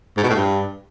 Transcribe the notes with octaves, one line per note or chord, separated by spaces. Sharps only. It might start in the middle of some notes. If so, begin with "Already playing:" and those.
G#2
B2
A2
G2